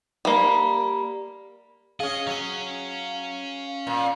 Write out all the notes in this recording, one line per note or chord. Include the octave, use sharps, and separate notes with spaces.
G3 A#3
C#4 G#4 D#5 F5
F#3 C#4
A#2